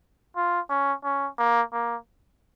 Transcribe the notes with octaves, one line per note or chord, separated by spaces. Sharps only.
F4
C#4
C#4
A#3
A#3